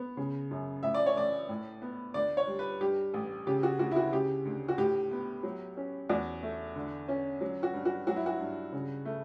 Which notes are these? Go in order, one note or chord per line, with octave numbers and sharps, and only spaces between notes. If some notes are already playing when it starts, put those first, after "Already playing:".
Already playing: B3
C#3
F#2
A2 E5
D5
C#5
A1 D5
A2
B3
D2 D5
C#5
G3
B4
G2 G4
A1
C#3 G4
F#4
D2 F#4
E4
F#4
C#3 G4
D2
F#4
A2 G4
B3
F#3
C#4
E2 F#4
A3
D3
C#4
F#3
F#4
G2
F#4
F#3 F#4
E4
F#4
G2
C#3
A3